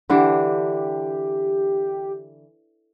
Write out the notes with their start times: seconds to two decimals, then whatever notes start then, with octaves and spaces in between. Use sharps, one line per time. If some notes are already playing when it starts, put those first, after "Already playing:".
0.10 D3 E3 D4 G4